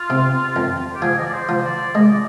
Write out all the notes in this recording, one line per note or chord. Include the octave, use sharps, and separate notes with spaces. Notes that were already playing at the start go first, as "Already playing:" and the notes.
Already playing: F4
C3
F2
G4
F3 G#4
D#5
D5
C5
F3
D5
G#3 D#5
D5